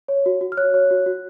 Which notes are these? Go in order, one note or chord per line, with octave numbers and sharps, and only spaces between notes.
C#5
F#4
F#4
F6
C#5 F#6
C#5
F#4
F#4